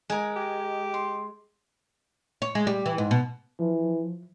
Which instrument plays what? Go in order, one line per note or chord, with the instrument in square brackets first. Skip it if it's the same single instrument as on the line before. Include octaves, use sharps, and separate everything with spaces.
[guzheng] G#3 [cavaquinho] A#4 G#5
[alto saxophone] G4
[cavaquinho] C6
[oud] C#5
G#3
G3
E3
G#2
B2
[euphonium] E3 [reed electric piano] F3